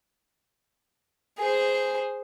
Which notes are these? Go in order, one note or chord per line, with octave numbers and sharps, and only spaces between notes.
G#4 C5